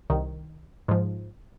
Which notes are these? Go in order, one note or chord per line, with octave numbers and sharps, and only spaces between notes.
C2 D#3
G#2 F3